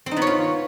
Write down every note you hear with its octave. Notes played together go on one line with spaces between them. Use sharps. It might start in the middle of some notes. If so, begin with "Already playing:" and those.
C4
D#4
B3
C#5
F4